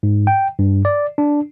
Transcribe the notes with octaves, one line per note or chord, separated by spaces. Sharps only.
G#2
G5
G2
D5
D4